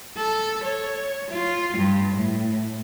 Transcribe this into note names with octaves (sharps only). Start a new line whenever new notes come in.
A4
C#5
F4
G2
A2